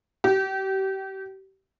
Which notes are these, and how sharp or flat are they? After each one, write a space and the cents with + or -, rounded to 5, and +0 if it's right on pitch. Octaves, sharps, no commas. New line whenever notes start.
G4 -30